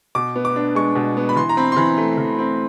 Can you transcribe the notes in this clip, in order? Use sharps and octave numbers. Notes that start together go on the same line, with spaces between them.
B2 D6
B3
D6
D4
G#3 C#6
B2
B3
B5
E3 C6
A#5
C4 B5
C6
E3 B5
A3
E3
C4